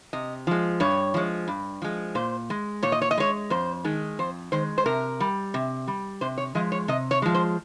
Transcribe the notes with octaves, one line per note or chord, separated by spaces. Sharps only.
C3 D#5
F3 G#3
G2 C#5
F3 G#3
G2
F3 G#3
A#2 C5
G#3
A#2 C#5
D#5
C#5
D#5
G#3 C#5
F2 C5
D#3 G#3
F2 C5
D#3 G#3 C5
C5
C3 A#4
G3
C3
G3
C3 C5
C#5
F3 G#3 D#5
C#5
C3 D#5
C#5
F3 G#3
C5